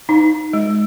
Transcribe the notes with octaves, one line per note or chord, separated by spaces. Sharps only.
D#4
G#3